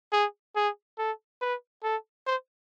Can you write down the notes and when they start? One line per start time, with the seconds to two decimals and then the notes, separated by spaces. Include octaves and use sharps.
0.12 G#4
0.56 G#4
0.98 A4
1.41 B4
1.83 A4
2.27 C5